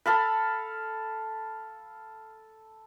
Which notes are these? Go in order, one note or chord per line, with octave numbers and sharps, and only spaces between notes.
A4 F5 B5